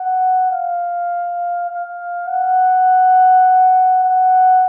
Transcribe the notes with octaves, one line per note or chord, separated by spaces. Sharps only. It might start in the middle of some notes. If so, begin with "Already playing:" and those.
Already playing: F#5
F5
F5
F#5
F#5